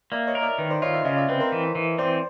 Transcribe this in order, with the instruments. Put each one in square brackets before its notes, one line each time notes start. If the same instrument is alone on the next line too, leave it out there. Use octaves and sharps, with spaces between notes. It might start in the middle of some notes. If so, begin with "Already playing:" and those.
[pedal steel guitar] A#3 [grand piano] D5 E5
[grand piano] C#5 D#5
[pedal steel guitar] A#4
[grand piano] D5 E5
[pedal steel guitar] D#3 [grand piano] B4
[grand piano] C5 D5
[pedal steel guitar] F4 [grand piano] C#5 D#5
[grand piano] D5 E5
[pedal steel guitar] C#3 [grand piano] D#5 F5
[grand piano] D5 E5
[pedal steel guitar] C4 [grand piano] B4
[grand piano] A#4 C5
[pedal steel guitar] E3
E3
[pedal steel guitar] C4 [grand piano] C5 D5